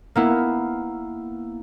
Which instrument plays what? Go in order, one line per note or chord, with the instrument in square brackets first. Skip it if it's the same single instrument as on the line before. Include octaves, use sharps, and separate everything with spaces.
[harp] A#3 B3 E4